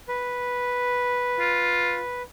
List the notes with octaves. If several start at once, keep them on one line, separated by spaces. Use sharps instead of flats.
B4
F4